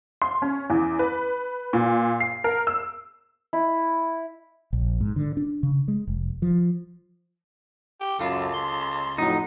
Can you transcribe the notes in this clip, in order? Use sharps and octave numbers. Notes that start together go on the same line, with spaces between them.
C6
C#4
E2
B4
A#2
C7
A#4
E6
E4
A#1
G#2
D3
D4
C#3
G#3
F1
F3
G4
C#2 F#2 F4 A4
C6
F2 A2 F#3 D#4